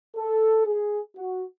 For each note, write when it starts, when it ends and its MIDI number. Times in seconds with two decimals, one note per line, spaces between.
0.16 0.61 69
0.66 1.00 68
1.16 1.44 66